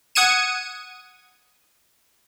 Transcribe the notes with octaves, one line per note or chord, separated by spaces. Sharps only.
F#5 D#6 G#6 C#7 D#7 E7